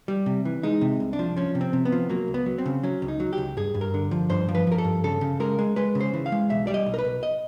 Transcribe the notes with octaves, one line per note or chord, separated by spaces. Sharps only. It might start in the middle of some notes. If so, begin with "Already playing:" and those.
G3
C3
E3
G#3 D#4
C3
C2
D4
F3
F3 C#4
C3
C4
C3
B3
F3
F#3 A#3
C#2
B3
F#3
C4
C#3
F#3 C#4
C#2
D#4
F#3
G4
C#2
G2 G#4
G2
A#4
D3
F3
G2 C5
F3
B4
F3 A#4
A4
G2
C#3 A4
C#3
G#3 A#4
G#3
G#3 B4
C#3
C5
E3
F5
G#3
B1 E5
G3 D5
D#5
B1
A#4
B4
B1
D#5